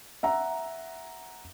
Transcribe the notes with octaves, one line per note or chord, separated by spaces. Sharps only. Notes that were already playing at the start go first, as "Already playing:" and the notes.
E5 F#5 A#5